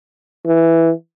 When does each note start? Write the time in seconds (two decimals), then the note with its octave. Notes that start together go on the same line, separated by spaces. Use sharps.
0.47 E3